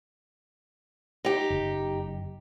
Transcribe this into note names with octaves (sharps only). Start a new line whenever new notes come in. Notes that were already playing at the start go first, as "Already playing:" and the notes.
D#4 G4
F#1